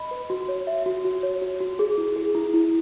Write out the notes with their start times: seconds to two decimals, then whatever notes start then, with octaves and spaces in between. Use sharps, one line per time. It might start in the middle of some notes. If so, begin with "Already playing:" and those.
Already playing: D#5 B5
0.11 B4
0.30 F#4
0.48 C#5
0.67 E5
0.86 F#4
1.04 F#4
1.23 C#5
1.42 F#4
1.61 F#4
1.79 G#4
1.98 E4
2.16 G#4
2.35 E4
2.54 E4